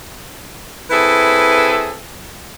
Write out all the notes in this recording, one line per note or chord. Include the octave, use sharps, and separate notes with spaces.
C4 E4 G#4 A4 B4 E5